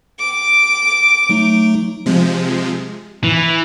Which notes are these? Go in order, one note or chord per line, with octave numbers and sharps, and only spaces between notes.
D6
F#3 A3 D#4
C3 F3 G#3
E3